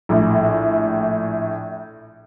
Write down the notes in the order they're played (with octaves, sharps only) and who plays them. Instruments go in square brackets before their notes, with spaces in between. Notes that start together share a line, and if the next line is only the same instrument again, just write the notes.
[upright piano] A#1 A2